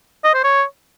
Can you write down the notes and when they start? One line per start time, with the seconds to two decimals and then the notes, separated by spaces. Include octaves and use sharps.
0.24 D#5
0.34 C5
0.44 C#5